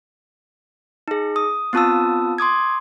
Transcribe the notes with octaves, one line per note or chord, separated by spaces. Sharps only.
D#4 G#4
D#6
B3 C4 F4 A5 D#6 E6
C6 D6 D#6 G#6